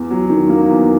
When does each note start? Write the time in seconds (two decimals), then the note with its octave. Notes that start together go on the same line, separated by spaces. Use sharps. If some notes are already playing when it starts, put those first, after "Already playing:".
Already playing: E2
0.11 F#3
0.30 D#3
0.50 A#3
0.69 E2